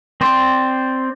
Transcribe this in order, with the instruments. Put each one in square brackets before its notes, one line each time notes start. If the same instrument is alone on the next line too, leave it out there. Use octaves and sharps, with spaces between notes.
[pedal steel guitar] C4 C5 D5